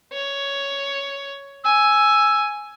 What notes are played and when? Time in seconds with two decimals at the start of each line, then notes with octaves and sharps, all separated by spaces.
0.13 C#5
1.65 G#5 E6